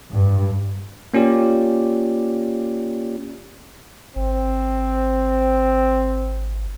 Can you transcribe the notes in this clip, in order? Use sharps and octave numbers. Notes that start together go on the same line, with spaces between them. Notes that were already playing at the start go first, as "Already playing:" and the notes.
G2
A#3 C#4 F4 G4 D5
G#1 C4